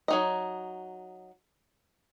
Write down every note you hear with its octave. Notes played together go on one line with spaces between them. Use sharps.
F#3 D#4 D#5